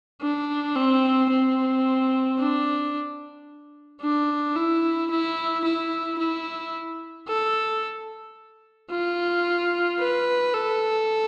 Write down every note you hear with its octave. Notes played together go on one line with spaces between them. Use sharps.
D4
C4
C4
D4
D4
E4
E4
E4
E4
A4
F4
B4
A4